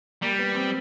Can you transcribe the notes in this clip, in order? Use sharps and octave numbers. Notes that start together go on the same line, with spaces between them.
G3 A#3
B3
C4